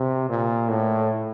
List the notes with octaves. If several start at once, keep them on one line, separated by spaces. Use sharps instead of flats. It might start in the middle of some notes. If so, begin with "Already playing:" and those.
Already playing: C3
A#2
A2